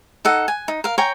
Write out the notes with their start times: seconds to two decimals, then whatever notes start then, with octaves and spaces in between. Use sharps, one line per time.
0.25 D#4 A4 F#5
0.48 G#5
0.68 D#4
0.84 A#4 F5
0.98 C#5 G5 G#5 A#5